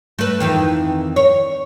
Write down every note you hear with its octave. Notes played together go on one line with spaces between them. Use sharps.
A3 B4
F2 D#3 E3
C#5